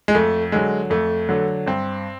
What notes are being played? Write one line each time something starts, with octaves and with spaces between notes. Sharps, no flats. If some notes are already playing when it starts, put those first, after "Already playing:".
G#3
F2 A3
D3 F#3 G#3
F2 A3
D3 F#3
G2 C4